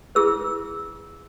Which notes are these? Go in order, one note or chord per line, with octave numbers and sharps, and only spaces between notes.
E4 G#4 B4 E6